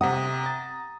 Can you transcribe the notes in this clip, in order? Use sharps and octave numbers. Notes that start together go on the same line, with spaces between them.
C3 F#5 A#5 D#6
A#5 A6